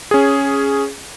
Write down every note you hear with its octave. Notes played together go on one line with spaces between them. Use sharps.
C#4 G#4